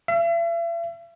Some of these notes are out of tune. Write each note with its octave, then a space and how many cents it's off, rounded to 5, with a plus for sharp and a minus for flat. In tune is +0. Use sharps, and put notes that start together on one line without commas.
E5 +40